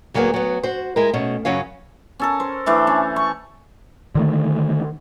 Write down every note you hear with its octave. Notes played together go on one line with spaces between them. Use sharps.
D2 F#3 A#3 B3 G#4
F#3 B3
F#4 C5
G#3 E4 A#4
B2 A3 C#4
F#2 C#3 F#3 C#4 F5
C#4 A4 A#4
C5
E3 A3 D4
C#4
C#6
D3 D#3 A3